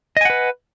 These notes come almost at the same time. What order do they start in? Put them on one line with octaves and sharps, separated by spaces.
D#5 G#5 F#5 B4